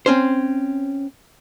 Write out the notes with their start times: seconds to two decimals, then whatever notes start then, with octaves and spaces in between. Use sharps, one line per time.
0.06 C4 C#4 C5